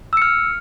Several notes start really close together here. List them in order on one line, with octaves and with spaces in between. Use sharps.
E6 C#7 F6